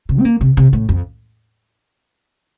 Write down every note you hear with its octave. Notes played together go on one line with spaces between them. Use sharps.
C3
C4
A#3
C3
C3
A2
F2